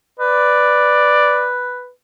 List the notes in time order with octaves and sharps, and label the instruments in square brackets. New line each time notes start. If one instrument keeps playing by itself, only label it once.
[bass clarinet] B4 [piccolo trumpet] D5